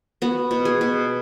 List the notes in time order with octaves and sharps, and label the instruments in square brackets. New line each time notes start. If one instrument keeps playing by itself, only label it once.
[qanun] B3 F#4
B2
G#4
B2